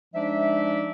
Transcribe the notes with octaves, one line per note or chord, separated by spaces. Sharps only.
F3 G#3 D4 D#4 D5 E5